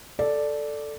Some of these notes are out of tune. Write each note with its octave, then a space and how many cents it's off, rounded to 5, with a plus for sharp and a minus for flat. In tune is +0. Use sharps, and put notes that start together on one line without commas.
A4 +0 D5 +0